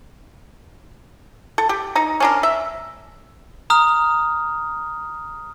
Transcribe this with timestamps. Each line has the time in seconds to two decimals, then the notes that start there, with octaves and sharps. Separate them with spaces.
1.58 A4
1.69 G4
1.95 D#4 A#5
2.20 C#4 D4 A#4
2.43 E5
3.70 A#5 D#6 F6